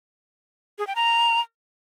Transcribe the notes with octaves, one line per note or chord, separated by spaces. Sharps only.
G#4
G5
A#5